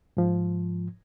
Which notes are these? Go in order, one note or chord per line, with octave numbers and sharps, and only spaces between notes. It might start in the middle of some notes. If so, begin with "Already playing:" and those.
G#2 F3